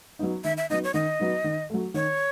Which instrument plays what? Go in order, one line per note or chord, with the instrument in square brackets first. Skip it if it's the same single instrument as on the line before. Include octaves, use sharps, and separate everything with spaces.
[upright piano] F#3 B3 D#4
[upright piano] D#3 [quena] E5
[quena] E5
[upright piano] F#3 B3 D#4 [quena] D#5
[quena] C#5
[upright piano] D#3 [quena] D#5
[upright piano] F#3 B3 D#4
D#3
F#3 A3
[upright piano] D#3 [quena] C#5